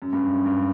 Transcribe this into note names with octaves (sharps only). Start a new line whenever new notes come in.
F#2
G2
F#2
G2